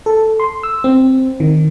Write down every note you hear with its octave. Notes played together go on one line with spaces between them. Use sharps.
A4
C6
E6
C4
D#3